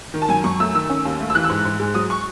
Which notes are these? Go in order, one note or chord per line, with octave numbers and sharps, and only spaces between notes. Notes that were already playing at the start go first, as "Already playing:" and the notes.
D#3
A5
F#2 G#5
F#2 C#6
A3 E6
D#3 E6
C#4
D#2
A3
E6
E3 F#6
E6
G#2
G#2
G#3
F#3 D#6
C#6